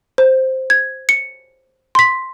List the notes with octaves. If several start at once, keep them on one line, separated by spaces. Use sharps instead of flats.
C5
G#6
C#7
C6 B6